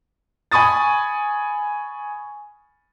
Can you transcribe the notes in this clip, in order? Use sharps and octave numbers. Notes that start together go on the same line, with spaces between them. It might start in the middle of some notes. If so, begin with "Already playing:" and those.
G#5 B5 C#6 D#6 A6